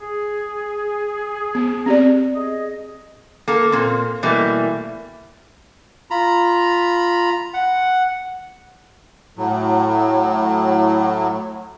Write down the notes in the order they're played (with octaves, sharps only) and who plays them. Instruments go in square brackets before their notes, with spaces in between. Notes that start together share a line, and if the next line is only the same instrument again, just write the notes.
[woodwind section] G#4
[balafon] B3
C4 G4 D5
[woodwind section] G#4 D#5
[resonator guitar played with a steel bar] A#3 A4
A#2 A#3 C4
B2 E3 G3 A3 A#3
[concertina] F4 A#5 B5
F#5
[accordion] A2 F#3